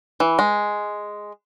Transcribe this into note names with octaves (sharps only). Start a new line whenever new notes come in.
E3
G#3